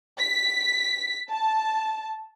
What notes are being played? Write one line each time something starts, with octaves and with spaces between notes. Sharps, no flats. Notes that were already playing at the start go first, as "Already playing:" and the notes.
B6
A5